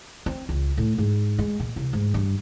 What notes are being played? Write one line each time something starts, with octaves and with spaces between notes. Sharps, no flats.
C4
C#2
A2
G#2
G#3
A#2
C2
G#2
G2